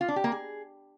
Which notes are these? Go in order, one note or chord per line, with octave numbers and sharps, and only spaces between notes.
F4
D4
G4
A#3
G#4